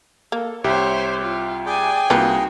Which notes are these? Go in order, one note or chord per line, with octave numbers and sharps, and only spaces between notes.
A#3 A4
C2 G4 C5 C#5 E5
F4
G#4 D5 G5 G#5
C2 A#3 D#4 F4 F#4 B4